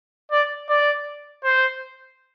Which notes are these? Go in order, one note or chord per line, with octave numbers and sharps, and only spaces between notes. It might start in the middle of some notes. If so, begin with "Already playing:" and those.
D5
D5
C5